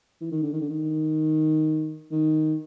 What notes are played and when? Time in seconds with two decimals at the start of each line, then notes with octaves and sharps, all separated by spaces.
0.21 E3
0.32 D#3
0.43 D3
0.53 D#3
0.61 D3
0.69 D#3
2.11 D#3